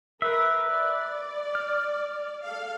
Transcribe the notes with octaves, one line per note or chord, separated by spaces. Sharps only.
A#4 B4 E5
D5
F6
A4 F5